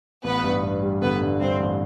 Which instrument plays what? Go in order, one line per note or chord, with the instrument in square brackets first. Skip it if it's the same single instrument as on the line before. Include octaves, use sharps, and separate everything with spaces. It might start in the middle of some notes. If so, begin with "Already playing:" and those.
[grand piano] A1 [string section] B3 B4
[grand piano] G2
G2
G3
[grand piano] D3 [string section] B3 B4
[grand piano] G2
[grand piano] G2 [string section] C4 C5
[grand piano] A1